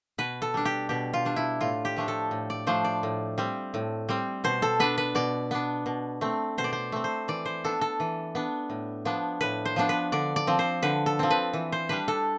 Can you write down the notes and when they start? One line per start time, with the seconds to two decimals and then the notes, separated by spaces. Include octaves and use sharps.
0.18 B2 B4
0.42 A4
0.54 G3 D4
0.65 G4
0.89 B2 G4
1.14 F4
1.25 G3 D4
1.36 E4
1.61 A2 F4
1.85 G4
1.96 F3 A3 D4
2.08 A4
2.31 A2
2.50 D5
2.67 F3 A3 D4 C5
2.85 D5
3.03 A2
3.38 G3 C4
3.74 A2
4.09 G3 C4
4.44 B2 C5
4.62 A4
4.80 B3 D4 B4
4.98 B4
5.15 B2 D5
5.51 B3 D4
5.86 B2
6.21 A3 C4
6.58 B2 C5
6.64 D5
6.73 C5
6.92 A3 C4
7.04 C5
7.28 E3 D5
7.45 C5
7.64 B3 D4 A4
7.81 A4
8.00 E3
8.35 B3 D4
8.70 A2
9.05 F3 B3 D4
9.41 A2 B4
9.65 C5
9.76 F3 B3 D4
9.89 B4
10.12 D3 D5
10.36 D5
10.47 F3 C4
10.59 C5
10.83 D3 B4
11.06 A4
11.19 F3 C4
11.31 B4
11.53 E3
11.72 C5
11.89 G3 D4 B4
12.08 A4